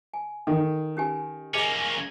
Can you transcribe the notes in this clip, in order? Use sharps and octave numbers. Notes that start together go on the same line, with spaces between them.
G#5
D#3 A4
C#4 G4 G#5
A#3 C#4 G#4 D#5 G#5